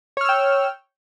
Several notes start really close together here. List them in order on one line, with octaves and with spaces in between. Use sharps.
C#5 F6 E6 G5